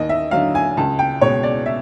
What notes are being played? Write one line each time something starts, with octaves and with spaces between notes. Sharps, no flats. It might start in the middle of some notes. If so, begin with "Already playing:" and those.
Already playing: D#2 D#5
E5
D3 F#3 F5
G#5
C#2 A5
G5
B2 G#3 C#5
D5
E5